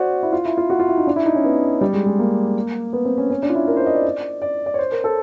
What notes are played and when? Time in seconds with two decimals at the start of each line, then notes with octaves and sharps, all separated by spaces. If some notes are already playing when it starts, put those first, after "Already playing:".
Already playing: F#4 C5 D5
0.23 E4
0.32 F4
0.45 E4
0.57 F4
0.70 F#4
0.79 F4
0.88 E4
0.97 D#4
1.07 D4
1.16 E4
1.26 D#4
1.35 C#4
1.44 B3
1.81 G3
1.94 G#3
2.06 G#3
2.19 A#3
2.93 B3
3.05 C4
3.18 C#4
3.30 C#4
3.43 D4
3.49 F4
3.55 E4
3.68 A#4
3.77 C5
3.86 D#5
3.95 D5
4.42 D5
4.66 D5
4.74 C#5
4.79 C5
4.92 A#4
5.04 A4